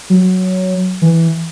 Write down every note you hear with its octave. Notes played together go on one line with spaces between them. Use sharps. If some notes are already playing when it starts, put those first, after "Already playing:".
F#3
E3